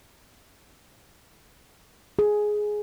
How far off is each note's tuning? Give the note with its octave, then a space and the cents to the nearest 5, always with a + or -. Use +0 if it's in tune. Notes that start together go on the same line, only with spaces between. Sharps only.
G#4 +10